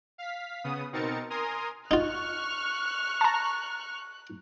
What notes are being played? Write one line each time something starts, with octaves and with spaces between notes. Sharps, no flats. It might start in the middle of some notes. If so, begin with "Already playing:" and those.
F5 B6
C#3 B3 D#6
B2 C4 D#4 A#4 A6 C#7
A#4 G#5 A#5 C6 D#6
D#4 F4 C#6 F6 F#6
A5 A#5